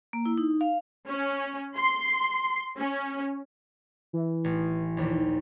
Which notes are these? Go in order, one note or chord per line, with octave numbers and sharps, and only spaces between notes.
A#3
E4
D#4
F5
C#4
C6
C#4
E3
A1
A#1 D#2